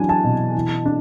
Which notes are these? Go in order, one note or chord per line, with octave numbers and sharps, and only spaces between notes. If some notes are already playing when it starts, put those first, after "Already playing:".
Already playing: E3 F#3 D4 G#5
A5
B2
E3
D4